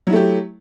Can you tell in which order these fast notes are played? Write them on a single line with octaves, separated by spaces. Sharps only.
F#3 E4 A3 G4